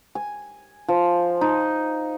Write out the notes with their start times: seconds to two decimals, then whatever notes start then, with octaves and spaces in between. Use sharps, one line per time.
0.15 G#5
0.89 F3
1.41 D#4